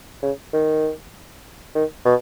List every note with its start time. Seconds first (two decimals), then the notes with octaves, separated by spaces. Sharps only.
0.23 C#3
0.53 D#3
1.75 D#3
2.05 B2